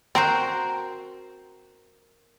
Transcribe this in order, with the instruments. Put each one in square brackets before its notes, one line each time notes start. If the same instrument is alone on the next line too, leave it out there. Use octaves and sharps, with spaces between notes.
[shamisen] C4 [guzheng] F#4 A#4 C5